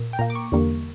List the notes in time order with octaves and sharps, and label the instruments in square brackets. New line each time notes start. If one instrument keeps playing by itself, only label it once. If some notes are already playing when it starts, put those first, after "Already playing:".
Already playing: [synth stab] A#2 A#3
G5
A#2 A#3 A#5
D6
C#6
E2 D3 G3 A#3